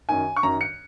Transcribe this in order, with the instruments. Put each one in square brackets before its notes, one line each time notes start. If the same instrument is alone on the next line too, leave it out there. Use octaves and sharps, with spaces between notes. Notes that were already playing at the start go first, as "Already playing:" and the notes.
[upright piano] F#2 D#3 G#5
C#6
F#2 D#3 A#5
C#7